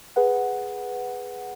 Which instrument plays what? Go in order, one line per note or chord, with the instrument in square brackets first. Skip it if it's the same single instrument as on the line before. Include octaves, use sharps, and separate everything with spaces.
[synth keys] G#4 B4 F#5